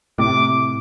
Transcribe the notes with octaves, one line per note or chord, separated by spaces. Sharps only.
A2 C3 D6